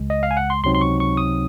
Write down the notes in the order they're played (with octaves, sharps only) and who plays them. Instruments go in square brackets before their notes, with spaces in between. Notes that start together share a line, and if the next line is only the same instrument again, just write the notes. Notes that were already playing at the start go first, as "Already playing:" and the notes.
Already playing: [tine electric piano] C#2 C#3 G#3
D#5
F5
G#5
F#5
C6
C#2 C3 F#3 C4 D#4 C6
C6
C#6
C#6
D#6